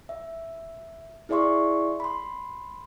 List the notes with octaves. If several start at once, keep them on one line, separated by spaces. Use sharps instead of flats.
E5
E4 G#4 D5 E5 C6 C#6
B5 C6